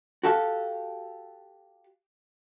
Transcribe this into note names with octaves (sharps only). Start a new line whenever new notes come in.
F#4 G4 A4 F5